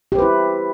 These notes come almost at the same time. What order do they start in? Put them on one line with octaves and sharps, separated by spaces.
G4 C5 B4 E4